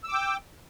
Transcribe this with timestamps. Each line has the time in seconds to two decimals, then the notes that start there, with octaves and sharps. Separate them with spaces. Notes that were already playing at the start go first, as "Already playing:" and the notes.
0.04 E6
0.09 D6
0.13 G5